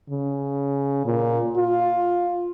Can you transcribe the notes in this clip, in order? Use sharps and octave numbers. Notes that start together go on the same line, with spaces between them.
C#3
A#2
F4